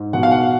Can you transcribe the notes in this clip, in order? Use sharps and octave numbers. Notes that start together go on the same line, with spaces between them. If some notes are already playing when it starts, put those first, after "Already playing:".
Already playing: G#2
B2 F#5
F5
F#5